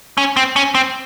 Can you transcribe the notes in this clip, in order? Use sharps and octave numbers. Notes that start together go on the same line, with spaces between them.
C#4
C4
C#4
C4